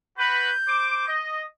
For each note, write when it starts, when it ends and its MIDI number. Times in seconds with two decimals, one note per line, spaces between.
0.18 0.50 66
0.18 0.50 71
0.18 1.12 91
0.68 1.08 72
0.68 1.08 86
1.08 1.43 75